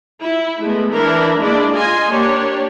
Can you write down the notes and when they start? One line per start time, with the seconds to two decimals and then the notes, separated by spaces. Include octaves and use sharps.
0.21 E4
0.61 G#3 A3 B3
0.92 E3 D4 E4 A#4
1.39 G#3 A#3 D4 E4 D5
1.72 F4 D#5 G#5 C6
2.08 A#3 D4 G4 C#5